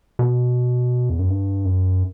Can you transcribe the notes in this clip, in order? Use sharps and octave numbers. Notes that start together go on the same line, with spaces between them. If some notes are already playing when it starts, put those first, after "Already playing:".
B2
E2
F#2
G2
F#2